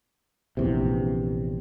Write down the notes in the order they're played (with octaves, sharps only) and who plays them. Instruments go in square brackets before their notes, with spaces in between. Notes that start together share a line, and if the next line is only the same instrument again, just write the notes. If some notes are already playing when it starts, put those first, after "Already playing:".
[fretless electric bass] A#1 E2 C3